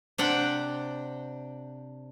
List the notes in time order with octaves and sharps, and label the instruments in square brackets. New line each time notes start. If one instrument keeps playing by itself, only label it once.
[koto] C3 D4 F#5 G5